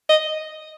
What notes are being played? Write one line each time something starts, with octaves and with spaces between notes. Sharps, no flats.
D#5